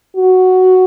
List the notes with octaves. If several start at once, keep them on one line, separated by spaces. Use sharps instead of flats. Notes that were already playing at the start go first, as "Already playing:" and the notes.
F#4